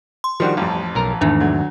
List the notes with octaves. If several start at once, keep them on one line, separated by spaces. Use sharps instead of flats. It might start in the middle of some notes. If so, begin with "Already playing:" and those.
C6
D#3 F3 G3 D4 F#4
A1 F2 G3
B1 A#4 A#5
E2 G#2 D#3 A3 D4
D3 F#3